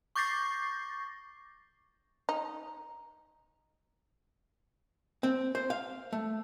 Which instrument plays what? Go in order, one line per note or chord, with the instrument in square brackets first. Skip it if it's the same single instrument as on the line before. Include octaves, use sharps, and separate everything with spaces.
[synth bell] C#6 D6 G6 A6 A#6 C7
[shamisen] D#4
[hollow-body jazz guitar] C4
C5
F5
A3